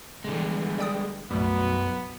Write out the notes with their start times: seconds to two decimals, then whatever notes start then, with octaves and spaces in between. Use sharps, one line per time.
0.25 D3 E3 G3 G#3 B3
0.79 D5 G5 D#6
1.31 B1 F#2 G3 A3 B3